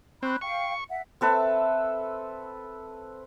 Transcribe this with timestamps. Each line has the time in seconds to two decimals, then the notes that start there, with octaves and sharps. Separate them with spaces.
0.23 C4 B5 C#6 F#6
0.41 F5 G5 C#6
0.90 E5 F#5
1.21 C4 A4 B4 E5